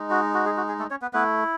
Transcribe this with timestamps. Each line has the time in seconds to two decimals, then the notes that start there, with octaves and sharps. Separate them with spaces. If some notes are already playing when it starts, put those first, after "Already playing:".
Already playing: G#3 D#4
0.10 F#4
0.34 F#4
0.45 G#4
0.57 F#4
0.68 G#4
0.79 A3 A4
0.90 C#4 C#5
1.02 B3 B4
1.13 A3 B3 E4 B4